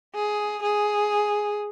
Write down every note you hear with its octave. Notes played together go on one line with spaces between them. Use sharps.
G#4
G#4